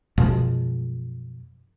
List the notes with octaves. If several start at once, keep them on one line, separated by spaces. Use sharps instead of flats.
F#2 B2 F3 G#3